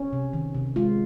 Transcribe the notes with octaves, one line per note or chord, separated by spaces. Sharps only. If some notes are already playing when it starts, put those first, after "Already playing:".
Already playing: C#4
C3
D#3
C3
G#3 F4